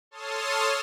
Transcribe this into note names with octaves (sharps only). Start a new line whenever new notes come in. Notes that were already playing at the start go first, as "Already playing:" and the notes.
A4 C#5 A5 C6 D#6 F6